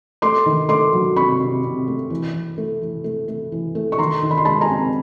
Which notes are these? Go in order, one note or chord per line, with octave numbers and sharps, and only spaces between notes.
A3 C6 D6
D#3
A3 C6 D6
F#3
C3 B5 C#6
C3
C3
A3
E3
E3
A3
E3
A3
A3
E3
A3
C#6
D#3 A#5 C6
D#3
B5
C6
G#3 A5 B5
G#5 A#5
C4